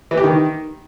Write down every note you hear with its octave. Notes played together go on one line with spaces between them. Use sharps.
E3
G4
D#3